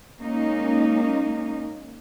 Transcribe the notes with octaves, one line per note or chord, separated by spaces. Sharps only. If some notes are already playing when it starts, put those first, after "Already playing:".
G#3 A#3 C#4 D#4